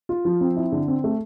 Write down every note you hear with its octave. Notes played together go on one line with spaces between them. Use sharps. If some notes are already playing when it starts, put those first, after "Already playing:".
F4
F3
C4
E4
D3
C4
A3